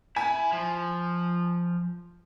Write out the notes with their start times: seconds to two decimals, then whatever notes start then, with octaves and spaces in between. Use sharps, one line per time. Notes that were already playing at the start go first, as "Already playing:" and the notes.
0.16 E4 G#5
0.52 F3